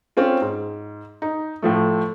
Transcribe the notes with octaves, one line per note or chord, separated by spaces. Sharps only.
C4 C#4 F4
G#2
D#4
A2 F3 A3